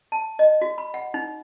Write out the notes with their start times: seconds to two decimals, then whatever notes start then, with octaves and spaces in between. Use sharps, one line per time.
0.12 A5
0.39 D#5
0.62 F#4
0.78 B5
0.94 F#5
1.14 D#4